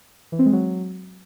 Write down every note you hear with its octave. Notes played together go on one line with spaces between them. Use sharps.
E3
C4
G#3
F#3